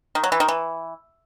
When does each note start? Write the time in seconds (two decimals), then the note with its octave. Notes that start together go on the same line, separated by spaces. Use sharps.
0.15 D#3
0.24 F#3
0.32 E3
0.40 D#3
0.48 E3